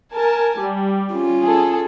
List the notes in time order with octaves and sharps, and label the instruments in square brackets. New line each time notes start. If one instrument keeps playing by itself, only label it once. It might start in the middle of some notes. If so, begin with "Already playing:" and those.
[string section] A#4 G#5 A5
G3
[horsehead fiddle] C#4 F4
[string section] G#4 A4